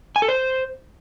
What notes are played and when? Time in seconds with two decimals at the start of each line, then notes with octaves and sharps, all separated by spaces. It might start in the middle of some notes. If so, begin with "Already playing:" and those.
0.16 G#5
0.22 A4
0.28 C5